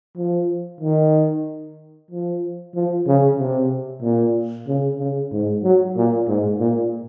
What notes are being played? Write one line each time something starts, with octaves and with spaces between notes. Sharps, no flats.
F3
D#3
F3
F3
C#3
C3
A#2
C#3
C#3
G#2
F#3
A#2
G#2
A#2